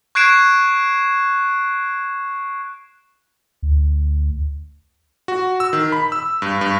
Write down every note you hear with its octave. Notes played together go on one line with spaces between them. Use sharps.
C#6 F#6 G#6 C7 D7 E7
D2
F#4
E6
D#3
B5
E6
G2
G2